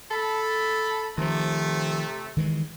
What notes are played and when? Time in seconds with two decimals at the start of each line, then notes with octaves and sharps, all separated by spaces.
0.11 A4 B5
1.18 C3 D#3 F3 A3
2.37 D#3 E3 G#3